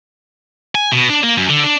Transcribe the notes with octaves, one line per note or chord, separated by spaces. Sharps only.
G#5
B2
D4
A#3
F#2
D3
D4